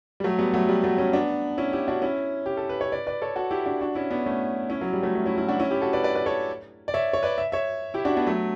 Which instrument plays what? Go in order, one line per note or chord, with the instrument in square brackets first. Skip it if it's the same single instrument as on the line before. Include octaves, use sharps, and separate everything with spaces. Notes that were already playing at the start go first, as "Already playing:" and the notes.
[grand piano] G3
F#3 A3
G3 B3
F#3 A3
G3
F#3 A3
A3 C#4
B3 D4
C#4 E4
E4 G4
D4 F#4
C#4 E4
G4
A4
B4
C#5
B4 D5
B4 D5
A4 C#5
F#4 A4
E4 G4
D4 F#4
D4 F#4
C#4 E4
B3 D4
A3 C#4
C#4 E4
F#3
G3
F#3 A3
A3 C#4
C#4 E4
C#4 E4
D4 F#4
C#4 E4
E4 G4
F#4 A4
B4 D5
B4 D5
B4 D5
A4 C#5
D5
C#5 E5
C#5
B4 D5
E5
C#5 E5
E4 G4
D4 F#4
B3 D4
F#3 A3